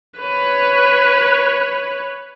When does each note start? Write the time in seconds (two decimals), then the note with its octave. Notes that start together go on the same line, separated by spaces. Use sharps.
0.19 B4 C#5